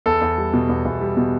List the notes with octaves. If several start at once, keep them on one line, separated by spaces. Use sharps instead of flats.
E2 A4
E2
G3
B2
E2
E2
G3
B2